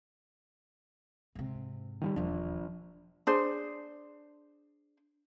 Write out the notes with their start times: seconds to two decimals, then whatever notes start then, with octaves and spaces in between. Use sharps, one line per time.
1.35 G#2 C3
2.01 D#3 F3 G3
2.16 E1 D#2 F3 D4
3.27 D4 G#4 C5